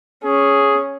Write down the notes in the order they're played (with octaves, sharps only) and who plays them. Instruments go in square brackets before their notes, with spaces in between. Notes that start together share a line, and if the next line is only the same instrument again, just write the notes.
[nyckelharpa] C#4 [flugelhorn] G#4